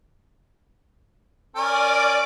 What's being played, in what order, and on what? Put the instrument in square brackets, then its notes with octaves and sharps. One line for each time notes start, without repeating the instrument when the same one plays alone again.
[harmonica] C#4 A#4 G#5 [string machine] D5 D6